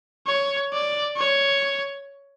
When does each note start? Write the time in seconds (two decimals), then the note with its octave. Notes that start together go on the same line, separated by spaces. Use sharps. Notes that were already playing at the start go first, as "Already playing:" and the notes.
0.27 C#5
0.73 D5
1.17 C#5